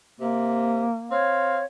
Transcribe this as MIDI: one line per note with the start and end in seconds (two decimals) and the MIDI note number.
0.20 0.85 48
0.20 1.23 58
1.11 1.62 60
1.11 1.65 73
1.11 1.63 77